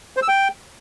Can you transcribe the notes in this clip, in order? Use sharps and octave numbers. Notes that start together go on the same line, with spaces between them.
C5
E6
G5